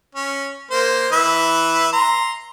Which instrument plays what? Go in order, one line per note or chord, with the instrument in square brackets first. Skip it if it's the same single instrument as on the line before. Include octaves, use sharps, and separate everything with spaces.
[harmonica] C#4
A#3 C5
E3 B4 E5
A#5 C6